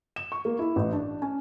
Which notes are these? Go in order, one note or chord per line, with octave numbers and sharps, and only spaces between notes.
E7
C#6
A#3
E4
A1
D4
C#4